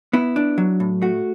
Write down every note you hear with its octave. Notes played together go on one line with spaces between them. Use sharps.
B3 E4
D4
F#3
A2
A3 F#4